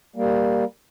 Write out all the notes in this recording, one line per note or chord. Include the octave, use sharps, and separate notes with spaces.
G3 A#3